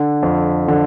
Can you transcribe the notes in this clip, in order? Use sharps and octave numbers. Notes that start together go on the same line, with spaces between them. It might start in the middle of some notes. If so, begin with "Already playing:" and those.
Already playing: D3
F2
D3